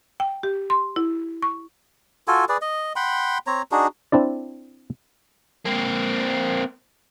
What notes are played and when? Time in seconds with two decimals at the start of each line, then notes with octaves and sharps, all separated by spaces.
0.20 G5
0.43 G4
0.70 C6
0.96 E4
1.42 C#6
2.28 F4 F#4 A4 G#5
2.49 G#4 B4 D5
2.62 D#5
2.96 F#5 G5 B5 C6
3.47 C4 C#5 A#5
3.71 D4 D#4 F#4 G#4
4.12 C4 D4 E4 D5
5.66 A#3 C4